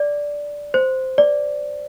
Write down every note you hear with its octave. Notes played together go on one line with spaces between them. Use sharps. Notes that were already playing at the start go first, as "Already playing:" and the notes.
Already playing: D5
C5
D5